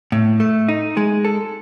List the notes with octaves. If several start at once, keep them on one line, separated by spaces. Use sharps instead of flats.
A2
A3
D#4
G#3
A4